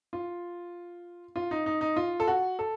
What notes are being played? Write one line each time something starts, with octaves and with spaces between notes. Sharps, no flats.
F4
F4
D#4
D#4
D#4
F4
A4
F#4
A4